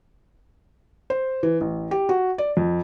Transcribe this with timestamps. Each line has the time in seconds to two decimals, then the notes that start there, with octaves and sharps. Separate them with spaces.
1.10 C5
1.43 E3
1.61 A1
1.91 G4
2.09 F#4
2.38 D5
2.57 F2